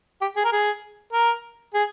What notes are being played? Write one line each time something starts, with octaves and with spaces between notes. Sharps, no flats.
G4
G#4
A#4
G#4
A#4
G#4